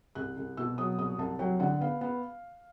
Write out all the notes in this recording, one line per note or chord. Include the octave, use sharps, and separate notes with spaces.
C2 F#6
C2
B2 E6
F#3 D#6
C2 D#6
C2 A5
F#3 G5
D3 F#5
B3 F5
B3